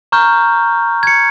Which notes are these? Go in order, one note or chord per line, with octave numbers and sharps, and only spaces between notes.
A#5 C#6 F6 G6
G#6 C#7